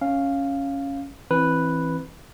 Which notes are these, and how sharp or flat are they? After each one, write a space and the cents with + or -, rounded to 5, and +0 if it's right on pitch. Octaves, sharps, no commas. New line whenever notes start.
C#4 +0 F5 +0
E3 +0 C4 +20 B4 +0